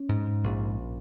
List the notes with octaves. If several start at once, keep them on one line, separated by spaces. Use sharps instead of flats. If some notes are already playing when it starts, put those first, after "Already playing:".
Already playing: C#4
G#2
A#1